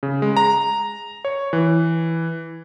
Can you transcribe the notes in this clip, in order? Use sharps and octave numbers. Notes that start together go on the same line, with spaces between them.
C#3
G#3
A#5
C#5
E3